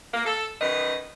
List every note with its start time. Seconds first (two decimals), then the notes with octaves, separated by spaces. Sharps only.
0.14 A#3
0.26 A4
0.61 F#2 D#3 B4 D#5